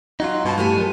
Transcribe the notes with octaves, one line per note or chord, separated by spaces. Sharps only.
F#3 D#4 F4
G2 B2 F4 A5
A2 A3 G4 G#5
F#3 F4 A#4